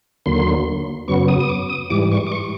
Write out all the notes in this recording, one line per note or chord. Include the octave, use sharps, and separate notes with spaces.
D#2 D3 F#3 A#3 C6
F#2 C#3 F#3 B3 C#6
D#6
D#6
D6
D#6
G#2 E3 G3 D6
C#6
D6
C#6